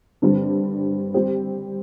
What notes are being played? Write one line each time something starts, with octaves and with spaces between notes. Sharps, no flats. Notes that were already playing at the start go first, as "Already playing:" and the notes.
G2 D3 G3 C4
G3 C4 G4 C5